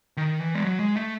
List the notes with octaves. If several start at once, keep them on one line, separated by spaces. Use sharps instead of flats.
D#3
E3
G#3
F#3
G#3
A3